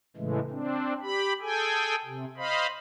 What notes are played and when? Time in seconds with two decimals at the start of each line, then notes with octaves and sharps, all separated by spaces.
0.17 A2 C#3 E3 G#3 A3
0.50 C4 D4
1.02 G4 B5
1.41 G#4 A4 G5 G#5
2.05 C3
2.37 C5 D#5 F5 B5